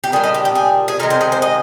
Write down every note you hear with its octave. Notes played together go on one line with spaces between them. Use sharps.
G4
A#2 G3 D4 G#4
D#5
G4
G4
G#4
G#4
C3 D#3 G#3 A#4
C5
G#4
C5
D#5